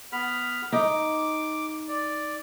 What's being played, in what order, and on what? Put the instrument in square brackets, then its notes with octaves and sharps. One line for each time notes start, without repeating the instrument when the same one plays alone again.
[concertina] B3 B5 F6
[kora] D#4 [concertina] D6
[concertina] D5